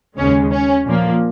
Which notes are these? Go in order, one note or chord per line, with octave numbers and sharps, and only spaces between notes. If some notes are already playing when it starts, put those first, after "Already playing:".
D#2 C#3 G#3 C#4
C#4
A#2 F3 A#3